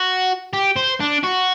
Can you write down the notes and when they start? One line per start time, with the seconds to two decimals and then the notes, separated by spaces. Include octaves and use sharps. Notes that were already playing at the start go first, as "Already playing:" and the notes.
Already playing: F#4
0.53 G4
0.76 C5
1.00 D4
1.24 F#4